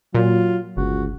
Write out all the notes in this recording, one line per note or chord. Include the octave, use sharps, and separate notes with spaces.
A#2 F#3 F4
G1 C#2 F#4